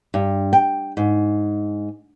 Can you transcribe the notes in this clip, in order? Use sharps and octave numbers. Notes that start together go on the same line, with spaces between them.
G2
G5
G#2